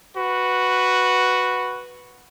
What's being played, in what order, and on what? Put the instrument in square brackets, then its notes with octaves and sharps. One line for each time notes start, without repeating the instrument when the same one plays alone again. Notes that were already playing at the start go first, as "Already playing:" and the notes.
[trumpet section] F#4 B4